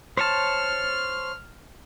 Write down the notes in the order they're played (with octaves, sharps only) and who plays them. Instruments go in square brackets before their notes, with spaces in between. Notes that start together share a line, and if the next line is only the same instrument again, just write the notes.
[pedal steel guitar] C5 C#5 A5 [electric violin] F6